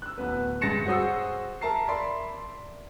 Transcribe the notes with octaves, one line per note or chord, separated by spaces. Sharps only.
E6 F#6
D1 B3 B4
G2 G#3 A6 A#6 C#7 E7
F#4 G#4 C5 D#6 E6
A#4 E5 A5 A#5 C7
D5 E5 B5 C6